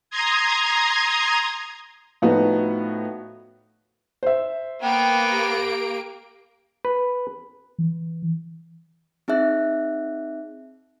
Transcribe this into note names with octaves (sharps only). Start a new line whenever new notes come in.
A#5 C6 D#6 G#6
A2 F3 B3 D#4 F#4
C5 E5
A#3 B3 G5 D7
G4
B4
E3
C4 D#4 G#4 E5 F#6